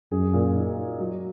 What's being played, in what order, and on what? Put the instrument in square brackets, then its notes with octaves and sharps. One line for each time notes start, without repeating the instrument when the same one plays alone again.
[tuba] F#2 [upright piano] G#4
[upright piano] A#2
D#4
D#4
F#3